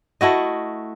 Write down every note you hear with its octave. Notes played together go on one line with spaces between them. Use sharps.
A3 E4 F#4 D#5